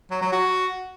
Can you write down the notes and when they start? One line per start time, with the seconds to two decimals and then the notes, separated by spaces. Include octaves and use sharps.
0.11 F#3
0.21 F#3
0.32 F#4